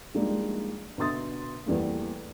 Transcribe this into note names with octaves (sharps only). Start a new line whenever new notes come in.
F3 G3 G#3 A#3 D4 D#4
B2 D3 E5 C6 D#6 A6
E2 E3 G3 A3 A#3